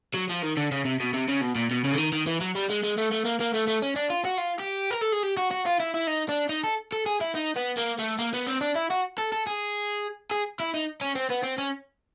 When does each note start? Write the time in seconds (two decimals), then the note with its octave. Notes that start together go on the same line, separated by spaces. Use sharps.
0.15 F#3
0.30 F3
0.43 D#3
0.57 D3
0.71 C#3
0.85 C3
1.00 B2
1.14 C3
1.29 C#3
1.41 B2
1.56 A#2
1.71 B2
1.84 C#3
1.92 D3
1.98 D#3
2.13 D#3
2.27 E3
2.41 F#3
2.55 G3
2.69 G#3
2.83 G#3
2.97 A3
3.11 A3
3.25 A#3
3.40 A#3
3.54 A3
3.67 A3
3.82 C#4
3.96 D4
4.10 F4
4.25 F#4
4.38 F4
4.60 G4
4.91 A#4
5.02 A4
5.12 G#4
5.23 G4
5.37 F#4
5.51 F#4
5.66 F4
5.79 E4
5.94 E4
6.07 D#4
6.29 D4
6.49 D#4
6.64 A4
6.92 A4
7.06 G#4
7.21 E4
7.35 D#4
7.56 B3
7.77 A#3
7.99 A3
8.19 A#3
8.34 B3
8.47 C4
8.61 D4
8.75 E4
8.90 F#4
9.18 A4
9.32 A4
9.47 G#4
10.31 G#4
10.60 E4
10.74 D#4
11.01 C#4
11.16 C4
11.30 B3
11.44 C4
11.58 C#4